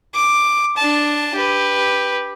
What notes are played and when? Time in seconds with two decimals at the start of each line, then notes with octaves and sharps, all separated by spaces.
0.15 D6
0.77 D4 A5
1.35 G4 B4